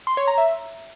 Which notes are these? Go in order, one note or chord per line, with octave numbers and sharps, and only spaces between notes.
C6
C#5
A#5
E5